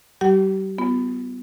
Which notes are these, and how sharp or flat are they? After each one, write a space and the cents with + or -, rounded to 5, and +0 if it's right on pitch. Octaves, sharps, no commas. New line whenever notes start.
G3 -40 G4 -35 F#5 +45
B3 +15 F4 +10